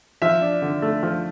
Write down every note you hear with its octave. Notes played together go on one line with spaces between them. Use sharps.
F3 E5
D4
D3
A3
F3